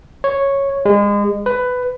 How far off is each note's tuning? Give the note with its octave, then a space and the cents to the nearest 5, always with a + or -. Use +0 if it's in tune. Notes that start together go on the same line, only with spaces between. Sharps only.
C#5 -5
G#3 -30
B4 +15